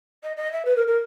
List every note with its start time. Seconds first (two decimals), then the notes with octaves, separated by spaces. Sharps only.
0.23 D#5
0.36 D#5
0.52 E5
0.65 B4
0.76 A#4
0.87 A#4